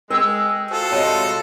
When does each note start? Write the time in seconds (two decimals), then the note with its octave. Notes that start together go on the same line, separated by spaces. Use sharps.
0.10 G#3 A#4 G5 E6
0.71 F4 F#4 A4 C5
0.91 C3 G3 G#3 C#5 A5